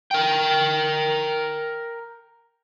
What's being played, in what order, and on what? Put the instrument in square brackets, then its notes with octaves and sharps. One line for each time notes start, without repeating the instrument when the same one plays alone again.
[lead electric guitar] A#4 G5